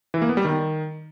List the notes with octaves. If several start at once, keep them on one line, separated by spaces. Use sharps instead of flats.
E3
A#3
B3
G3
D#3